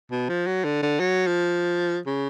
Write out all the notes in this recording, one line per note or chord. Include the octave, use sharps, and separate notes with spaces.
B2
F3
F#3
D3
D3
F#3
F3
C#3